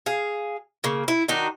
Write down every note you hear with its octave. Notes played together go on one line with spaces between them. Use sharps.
G#4 F5
C#3 A#3
E4
D#3 D4 D#4 F#4